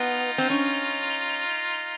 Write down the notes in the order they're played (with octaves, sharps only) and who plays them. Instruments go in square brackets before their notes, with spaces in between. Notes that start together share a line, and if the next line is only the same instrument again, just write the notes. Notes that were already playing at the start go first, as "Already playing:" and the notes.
Already playing: [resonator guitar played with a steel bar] B3 [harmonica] D#4 F4
[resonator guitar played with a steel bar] C4
C#4